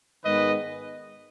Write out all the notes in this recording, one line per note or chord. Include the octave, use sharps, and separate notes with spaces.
G#2 D#3 G#3 B3 B4 D#5